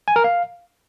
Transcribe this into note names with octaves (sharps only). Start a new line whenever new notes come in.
G#5
A#4
F5